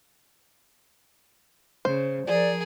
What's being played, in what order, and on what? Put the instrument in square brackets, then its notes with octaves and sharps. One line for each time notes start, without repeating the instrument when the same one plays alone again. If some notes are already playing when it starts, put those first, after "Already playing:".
[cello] C#3 [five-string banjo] C5
[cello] F3 [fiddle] G#4 A#4 [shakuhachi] D5